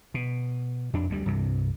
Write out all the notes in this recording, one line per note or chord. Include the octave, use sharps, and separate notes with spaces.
B2
F2 D4
D2 G3
C2 G2 C3